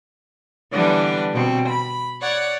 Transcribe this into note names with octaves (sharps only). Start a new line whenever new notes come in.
D3 E3 G3 B3 D4
B2 C4
B5
C#5 D5 F#5